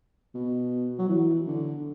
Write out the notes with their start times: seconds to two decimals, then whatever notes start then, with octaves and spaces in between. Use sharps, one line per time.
0.34 B2
0.99 F#3
1.09 E3
1.47 D3